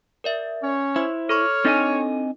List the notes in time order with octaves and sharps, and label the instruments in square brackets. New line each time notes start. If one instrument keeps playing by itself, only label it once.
[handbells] A#4 D5 E5
[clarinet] C#4 [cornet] C#5
[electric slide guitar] E4 [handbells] C5 B5 C6
[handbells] A4 B5 C#6 [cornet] C#5 [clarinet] F6
[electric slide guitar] C4 D#5 G#5 [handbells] D4 D#4 A4